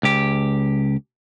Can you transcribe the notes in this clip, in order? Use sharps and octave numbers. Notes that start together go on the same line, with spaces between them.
C#2 G4